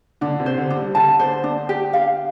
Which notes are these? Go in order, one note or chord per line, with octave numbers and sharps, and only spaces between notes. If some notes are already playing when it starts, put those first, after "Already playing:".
D3 D4
C3
C5
D3
D4
G3
D3 A5
C5
D4
G4
F5